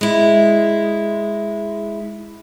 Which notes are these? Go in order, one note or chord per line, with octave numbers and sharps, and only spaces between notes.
G#3 E4